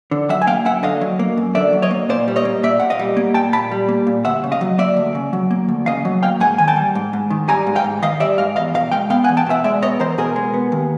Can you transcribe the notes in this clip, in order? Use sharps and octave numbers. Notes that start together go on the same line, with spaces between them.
D3
F#3 E5 F#5
G#5
A#3 F5 G5
F#2 E5 F#5
D3 D#5 F5
F#3
A#3
F#2
D3 D5 E5
F#3
C#5 D#5
A#3
A#2 C5 D5
G3
C#5 D#5
A#3
A#2 D5 E5
A#2 F#5
D#5 F5
G3
A#3
A#2 G5 A5
A#2 A5 B5
G3
A#3
A#2
D2 E5 F#5
C#3
D#5 F5
F#3
A#3 D5 E5
D2
C#3
F#3
A#3
D2
C#3 D#5 F5
F#3
A#3 F5 G5
G#2 F#5 G#5
D#3 G#5
G5 A5
G3
G#2
G#2
D#3
G3 G#5 A#5
G#2
F5 G5
G#2
D#3 D#5 F5
G3 D5 E5
G#2 D#5 F5
E2 D#5 F5
B2 D#5 F5
G#3 F5 G5
B3 F5 G5
F#5 G#5
E2
G5 A5
B2 E5 F#5
G#3 D5 E5
B3 C#5 D#5
E2 A#4 C5
B2 G#4 A#4
G#3
B3
D#2